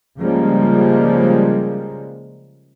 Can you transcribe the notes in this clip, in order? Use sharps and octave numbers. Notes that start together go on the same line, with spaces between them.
C#3 F3 G3 G#3 A#3